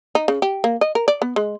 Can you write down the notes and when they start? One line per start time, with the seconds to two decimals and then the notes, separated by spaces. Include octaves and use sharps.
0.15 D#4
0.28 C#3
0.42 G4
0.64 A#3
0.81 D#5
0.95 A#4
1.08 D5
1.22 B3
1.36 G#3